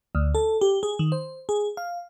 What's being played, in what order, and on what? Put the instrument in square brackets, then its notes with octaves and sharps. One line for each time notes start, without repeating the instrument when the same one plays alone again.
[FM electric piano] D2
A4
G4
G#4
D#3
C5
G#4
F5